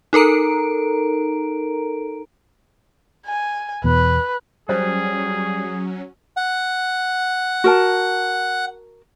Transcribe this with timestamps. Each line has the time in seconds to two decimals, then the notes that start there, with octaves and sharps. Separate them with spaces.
0.13 D#4 A4 A#4 A#5 D7
3.26 G#5
3.84 E2 B2 B4
4.69 F#3 G3 C#4 G#4 C5
6.37 F#5
7.64 F#4 A#4 A5